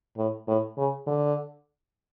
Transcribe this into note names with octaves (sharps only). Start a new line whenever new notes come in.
A2
A2
C#3
D3